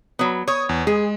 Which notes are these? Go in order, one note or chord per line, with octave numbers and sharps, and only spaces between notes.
F#3 B3
C#5 C#6 D#6
E2
G#3 G#4